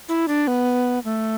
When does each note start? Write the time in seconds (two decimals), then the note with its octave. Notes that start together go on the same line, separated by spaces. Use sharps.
0.09 E4
0.28 D4
0.47 B3
1.04 A3